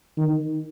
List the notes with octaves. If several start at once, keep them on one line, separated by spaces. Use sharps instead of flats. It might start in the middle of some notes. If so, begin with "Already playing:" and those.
D#3